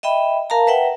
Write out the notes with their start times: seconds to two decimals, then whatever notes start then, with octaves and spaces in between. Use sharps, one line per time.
0.03 D#5 E5 G5 B5
0.50 A#4 F5 A5 A#5
0.67 B4 E5 F#5 G5